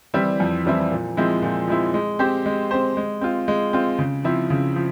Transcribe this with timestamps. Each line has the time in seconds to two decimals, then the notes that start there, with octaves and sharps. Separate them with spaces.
0.14 E3 G3 C4 E4
0.40 F2
0.66 E3 G3 C4 E4
0.91 A#2
1.17 F3 G#3 C4 E4
1.42 A#2
1.68 F3 G#3 C4 E4
1.94 G#3
2.19 C4 G4 C5
2.46 G#3
2.71 C4 G4 C5
2.97 G#3
3.21 C4 F4
3.48 G#3
3.73 C4 F4
3.99 C#3
4.24 F3 C4 E4
4.50 C#3
4.76 F3